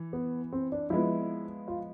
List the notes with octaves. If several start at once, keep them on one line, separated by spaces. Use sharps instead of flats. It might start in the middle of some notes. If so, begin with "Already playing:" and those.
Already playing: E3
B3
C4
D4
F3 G#3 B3 E4
F4